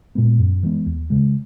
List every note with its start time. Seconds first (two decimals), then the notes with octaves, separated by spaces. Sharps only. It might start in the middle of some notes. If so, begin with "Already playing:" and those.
0.15 A#2 G#3 B3
0.38 F#2
0.63 E3 G#3 B3
0.86 D#2
1.10 C#3 G#3